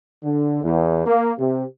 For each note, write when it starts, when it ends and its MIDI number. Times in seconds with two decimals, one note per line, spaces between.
0.24 0.62 50
0.64 1.05 40
1.06 1.33 58
1.39 1.63 48